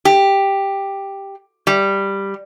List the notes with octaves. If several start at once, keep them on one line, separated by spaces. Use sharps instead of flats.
G4
G3